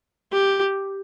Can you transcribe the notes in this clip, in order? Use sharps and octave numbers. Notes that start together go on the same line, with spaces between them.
G4